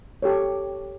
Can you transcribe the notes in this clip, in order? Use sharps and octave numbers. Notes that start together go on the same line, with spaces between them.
G4 A4 C#5